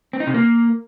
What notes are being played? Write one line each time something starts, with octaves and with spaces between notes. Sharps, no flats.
C4
D#4
C3
A#3